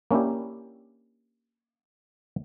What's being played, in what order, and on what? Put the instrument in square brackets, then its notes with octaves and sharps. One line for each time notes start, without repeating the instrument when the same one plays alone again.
[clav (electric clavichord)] A#3 C#4 D4 E4 G4